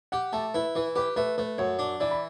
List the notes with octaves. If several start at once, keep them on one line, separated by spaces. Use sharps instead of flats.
G4 F#5
A3 A5
E4 B4
E3 B4
G4 B4
A3 B4
A3 B4
F#2 C#5
D4
E3 D5
B5